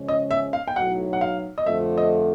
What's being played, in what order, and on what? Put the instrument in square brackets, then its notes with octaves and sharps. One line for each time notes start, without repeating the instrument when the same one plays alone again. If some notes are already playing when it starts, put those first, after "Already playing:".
Already playing: [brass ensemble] C#3 F3 G#3 C#4
[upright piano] D#5
E5
F5
G5
[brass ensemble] B1 A2 F#3 B3 [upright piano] F#5
[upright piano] F#5
F5
D#5
[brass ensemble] F2 D3 F3 A3 [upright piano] E5
[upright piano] D#5